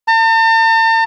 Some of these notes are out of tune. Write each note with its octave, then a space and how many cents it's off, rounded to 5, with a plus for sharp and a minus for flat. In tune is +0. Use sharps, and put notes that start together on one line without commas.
A5 +45